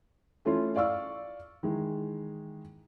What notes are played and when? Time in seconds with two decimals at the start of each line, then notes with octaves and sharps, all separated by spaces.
0.45 E3 A3 C#4 F4
0.76 D5 F5 C#6 E6
1.63 D#3 E3 G#3